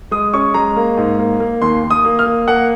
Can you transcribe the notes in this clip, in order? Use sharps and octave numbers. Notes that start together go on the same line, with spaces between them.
G#3 D#6
C#4 C#6
G#3 A#5
A#3
G#2
A#3
A#3
D#2 C6
D#2
D#6
A#3
F6
A#3
A#3 F#5